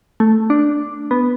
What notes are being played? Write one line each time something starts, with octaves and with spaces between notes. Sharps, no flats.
A3
D4
B3